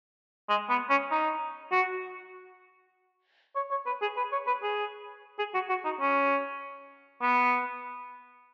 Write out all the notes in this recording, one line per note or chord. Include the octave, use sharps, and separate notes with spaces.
G#3
B3
C#4
D#4
F#4
C#5
C#5
B4
G#4
B4
C#5
B4
G#4
G#4
F#4
F#4
D#4
C#4
B3